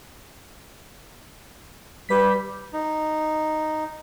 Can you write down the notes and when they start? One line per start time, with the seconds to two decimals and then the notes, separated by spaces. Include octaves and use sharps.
2.09 G3 G4 B4 B6
2.73 D#4